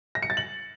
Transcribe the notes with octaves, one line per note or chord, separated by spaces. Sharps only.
A#6
C#7
A6
F#7